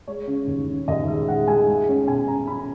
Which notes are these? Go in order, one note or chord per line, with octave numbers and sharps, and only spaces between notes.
G#3 C#5
C#3
D#2
C#3
D#2 D#5
G#3 E5
G#3 F#5
G#3 G#5
G#3
C#4
B2 G#5
C#4 A#5
C#4 B5